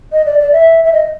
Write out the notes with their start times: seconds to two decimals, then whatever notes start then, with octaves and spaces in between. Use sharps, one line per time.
0.12 D#5
0.26 D5
0.39 D5
0.52 E5
0.85 E5
0.93 D#5